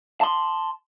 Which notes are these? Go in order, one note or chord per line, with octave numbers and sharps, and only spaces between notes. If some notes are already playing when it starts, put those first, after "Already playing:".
A5 C6